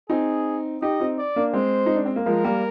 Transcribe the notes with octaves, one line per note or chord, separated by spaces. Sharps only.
C4 D#4 G#4
D#4 G4 D#5
C4 D#4
D5
A#3 D4
G#3 C4 C5
D#4
D4
C4
A#3
F3 G#3 A#4
G3 A#3